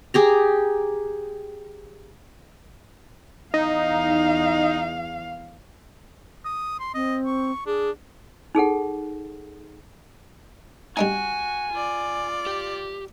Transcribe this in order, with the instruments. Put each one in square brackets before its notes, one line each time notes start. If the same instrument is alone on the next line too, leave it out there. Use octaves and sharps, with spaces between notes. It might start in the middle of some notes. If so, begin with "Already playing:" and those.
[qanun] G4 G#4 A#5
[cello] E2 F5 [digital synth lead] D#4
[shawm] D#6
C6
[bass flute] C4 [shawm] D#5
[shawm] C#6
[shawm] D4 [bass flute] G#4
[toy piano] D#4 G#4 A4 F#5
[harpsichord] G3 D4 D#4 [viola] F#4 [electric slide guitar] G#5
[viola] F4 D5
[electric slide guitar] G4